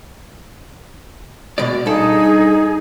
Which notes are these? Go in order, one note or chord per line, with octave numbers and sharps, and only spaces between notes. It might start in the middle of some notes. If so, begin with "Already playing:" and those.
B2 G#3 D5
G2 D#4 G#4 A4